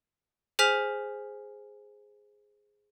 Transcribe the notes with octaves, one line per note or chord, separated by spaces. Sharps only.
G#4 C5 G#5 F6 B6 F7